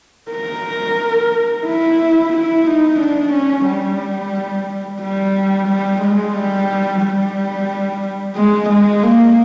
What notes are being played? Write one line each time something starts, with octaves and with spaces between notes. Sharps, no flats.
A#4
E4
E4
D#4
D4
C#4
G3
G3
G3
G#3
G3
G3
G#3
G#3
A#3